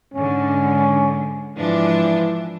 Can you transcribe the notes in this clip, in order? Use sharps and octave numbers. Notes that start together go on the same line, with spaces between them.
G#2 D3 C#4
G#2 E3 F3 D4